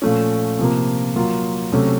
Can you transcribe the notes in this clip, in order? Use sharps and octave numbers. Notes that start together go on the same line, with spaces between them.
A#2 F3 A3 C#4
C3 F3 A#3
F#3 A#3 F4
C3 F#3 A3 C#4